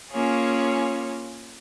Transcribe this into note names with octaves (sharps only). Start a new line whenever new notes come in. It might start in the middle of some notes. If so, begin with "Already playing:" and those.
A#3 C#4 F4 G#4 C#5